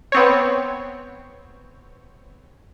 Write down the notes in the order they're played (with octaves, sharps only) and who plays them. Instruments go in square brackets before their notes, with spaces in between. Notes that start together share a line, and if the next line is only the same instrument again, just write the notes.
[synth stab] B3 C4 C#5